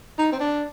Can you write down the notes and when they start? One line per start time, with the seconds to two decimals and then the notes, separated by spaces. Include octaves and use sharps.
0.18 D#4
0.32 C4
0.40 D4